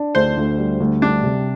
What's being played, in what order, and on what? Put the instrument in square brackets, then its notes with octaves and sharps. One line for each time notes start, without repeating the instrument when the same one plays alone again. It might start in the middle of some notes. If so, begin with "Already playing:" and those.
Already playing: [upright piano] D4
[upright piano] D2 [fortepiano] C5
[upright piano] D2
G3
D2
[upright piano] G3 [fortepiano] D4
[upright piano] C3